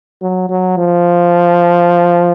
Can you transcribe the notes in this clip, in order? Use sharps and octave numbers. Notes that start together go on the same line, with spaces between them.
F#3
F#3
F3